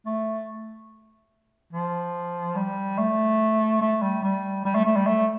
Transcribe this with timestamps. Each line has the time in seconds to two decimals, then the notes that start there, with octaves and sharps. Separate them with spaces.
0.06 A3
1.73 F3
2.56 G3
2.98 A3
3.81 A3
4.02 G3
4.23 G3
4.65 G3
4.75 A3
4.85 A3
4.96 G3
5.07 A3